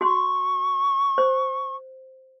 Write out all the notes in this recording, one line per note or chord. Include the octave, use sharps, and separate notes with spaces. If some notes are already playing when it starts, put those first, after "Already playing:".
F#4 C6 C#6
C5